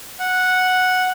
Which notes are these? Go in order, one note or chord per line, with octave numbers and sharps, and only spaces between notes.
F#5